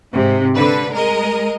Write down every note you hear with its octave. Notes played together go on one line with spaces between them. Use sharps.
G#2 C3
D3 B4
G#3 A#4 D#5